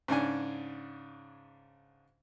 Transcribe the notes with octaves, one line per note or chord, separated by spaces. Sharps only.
G#2 C#3 D4 G#5